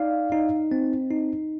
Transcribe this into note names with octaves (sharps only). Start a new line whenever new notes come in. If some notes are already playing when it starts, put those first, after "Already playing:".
Already playing: D#4 D5 F5
D#4
C4
D#4